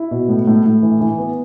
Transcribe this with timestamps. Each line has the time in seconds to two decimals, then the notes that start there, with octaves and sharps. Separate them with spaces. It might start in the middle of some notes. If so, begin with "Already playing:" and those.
Already playing: E4
0.11 B2
0.29 A2
0.47 A2
0.65 A2
0.82 E3
1.01 E3
1.18 B3